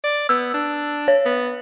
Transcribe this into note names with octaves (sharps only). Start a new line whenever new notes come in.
D5
B3 E6
D4
C#5
B3